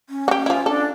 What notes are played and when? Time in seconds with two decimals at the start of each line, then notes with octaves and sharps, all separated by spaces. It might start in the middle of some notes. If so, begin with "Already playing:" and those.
0.09 C#4
0.28 F#4 G4
0.46 F3 E4 F4
0.66 D4 A4